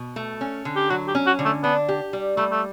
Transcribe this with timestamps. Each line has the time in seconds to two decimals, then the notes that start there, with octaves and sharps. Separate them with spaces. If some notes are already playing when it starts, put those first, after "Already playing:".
Already playing: B2
0.16 A3
0.41 C#4
0.65 D3
0.76 G4
0.90 F#3 F#4
1.08 G4
1.15 C#4
1.27 F#4
1.39 D3
1.45 A3
1.63 B3 D4
1.89 G4
2.13 G3
2.37 G3 A3
2.51 A3